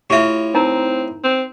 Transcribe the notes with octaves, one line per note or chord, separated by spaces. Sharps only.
A2 F4 G4 E5
C4 D#4 A#4 A#5
C4